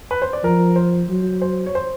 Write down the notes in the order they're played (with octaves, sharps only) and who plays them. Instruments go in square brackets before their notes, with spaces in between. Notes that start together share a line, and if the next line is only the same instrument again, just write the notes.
[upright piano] B4
C5
D5
[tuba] F3 [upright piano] A#4
[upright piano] C5
[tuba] F#3
[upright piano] C5
C#5
C5